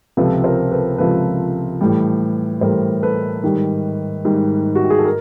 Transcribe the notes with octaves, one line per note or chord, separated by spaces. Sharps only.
C#2 C3 F3 A4 B4
A#4 C5
A4 B4
C#2 C3 F3 A4 B4
A2 E3 G3
A2 E3 G3 A#4 C5
A4 B4
G#2 D#3 G3
G#2 D#3 G3
F#4
G4
G#4
A4
A#4